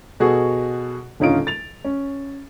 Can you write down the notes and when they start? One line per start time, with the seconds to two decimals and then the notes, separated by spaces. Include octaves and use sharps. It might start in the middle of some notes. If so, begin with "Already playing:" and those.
0.20 B2 F#4 G#4 A4
1.20 D#1 D3 C#4 D#4 F4 D7
1.47 A6 F7
1.85 C#4